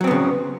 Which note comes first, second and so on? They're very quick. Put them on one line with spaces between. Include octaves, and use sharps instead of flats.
F#3 C4 B3 C#3